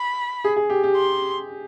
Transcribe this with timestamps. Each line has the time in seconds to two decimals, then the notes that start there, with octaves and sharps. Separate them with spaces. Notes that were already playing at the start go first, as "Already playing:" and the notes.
Already playing: B5
0.44 G#4
0.56 G#4
0.70 G4
0.84 G4
0.96 C6